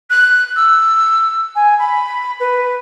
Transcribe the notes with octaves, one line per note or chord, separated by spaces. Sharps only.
F#6
E6
G#5
B5
B4